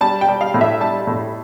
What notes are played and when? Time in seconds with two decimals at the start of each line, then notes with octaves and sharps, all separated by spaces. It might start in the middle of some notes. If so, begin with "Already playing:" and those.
0.01 G3 A5
0.21 G5
0.28 G3
0.41 F5
0.54 A2
0.61 E5
0.80 G3 A5
1.07 A2